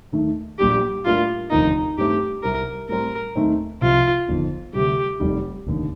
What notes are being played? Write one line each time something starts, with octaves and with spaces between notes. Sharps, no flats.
D#2 D#3 A3 D#4
A#1 A#2 G3 D4 G4
A2 G3 A#3 D4 F4
F1 D#2 D3 F3 A#3 D#4
G2 D#3 A3 C4 G4
C2 C3 G3 C4 A#4
A2 G3 C4 A#4
D#2 D#3 A3 C4 D#4
C2 C3 F3 F4
G1 F2 D#3
D2 C3 G3 G4
F1 F2 D#3 G3
F1 D#2 D3